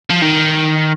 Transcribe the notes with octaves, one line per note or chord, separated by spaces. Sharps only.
F3
D#3